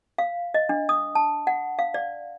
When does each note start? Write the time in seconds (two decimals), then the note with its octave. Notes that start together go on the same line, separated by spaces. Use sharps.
0.18 F5
0.54 D#5
0.69 D4
0.89 D#6
1.15 A5
1.47 F#5
1.79 F5
1.94 D5